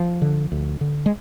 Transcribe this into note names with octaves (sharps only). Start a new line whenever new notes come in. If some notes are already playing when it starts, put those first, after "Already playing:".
Already playing: F3
D3
D2
D3
G#3